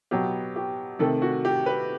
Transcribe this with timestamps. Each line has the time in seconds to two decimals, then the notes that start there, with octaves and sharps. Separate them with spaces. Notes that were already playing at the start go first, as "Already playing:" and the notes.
0.11 B2 F#3 B3 G4
0.56 G4
0.99 C3 D#3 A3 A4
1.22 F#4
1.45 G4
1.66 B4